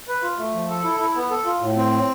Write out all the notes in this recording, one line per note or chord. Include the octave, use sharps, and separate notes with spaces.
B4
F4
A3
F3
A4
E4
E4
B3
A4
F4
A2
C4